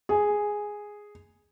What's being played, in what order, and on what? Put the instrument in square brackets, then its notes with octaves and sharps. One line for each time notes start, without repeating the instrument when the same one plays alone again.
[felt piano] G#4